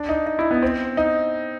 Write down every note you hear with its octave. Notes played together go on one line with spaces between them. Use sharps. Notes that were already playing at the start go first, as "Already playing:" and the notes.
Already playing: D4
D#4
D#4
E4
B3
C4
D#4